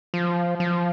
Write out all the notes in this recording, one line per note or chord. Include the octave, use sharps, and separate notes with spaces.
F3
F3